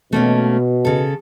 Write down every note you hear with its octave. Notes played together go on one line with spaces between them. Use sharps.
B2 A3 A#3 C#4
C#3 A4